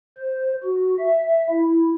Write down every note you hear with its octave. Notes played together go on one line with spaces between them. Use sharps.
C5
F#4
E5
E4